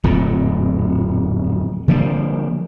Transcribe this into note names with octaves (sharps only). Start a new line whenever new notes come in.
D1 F2 A#2 D3
D3 F3 G3 A#3